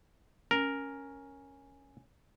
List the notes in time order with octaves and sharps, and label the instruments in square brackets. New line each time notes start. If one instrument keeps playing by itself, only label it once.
[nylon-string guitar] C#4 [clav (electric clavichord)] A#4